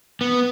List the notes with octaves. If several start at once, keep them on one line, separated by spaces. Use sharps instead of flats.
B3